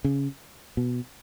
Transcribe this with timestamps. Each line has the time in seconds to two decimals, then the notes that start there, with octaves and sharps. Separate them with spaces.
0.05 C#3
0.77 B2